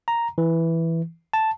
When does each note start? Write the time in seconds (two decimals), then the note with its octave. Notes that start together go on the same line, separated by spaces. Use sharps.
0.08 A#5
0.38 E3
1.33 A5